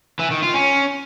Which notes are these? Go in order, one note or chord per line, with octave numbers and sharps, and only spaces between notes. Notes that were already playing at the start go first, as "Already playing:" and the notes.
E3
D#3
F4
C#4